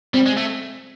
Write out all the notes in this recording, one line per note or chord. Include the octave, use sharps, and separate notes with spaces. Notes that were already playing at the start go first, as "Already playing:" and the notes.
G3 C4
G#3
A3